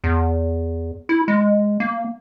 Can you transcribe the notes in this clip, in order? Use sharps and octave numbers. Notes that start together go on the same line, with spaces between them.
E2
E4
G#3
A#3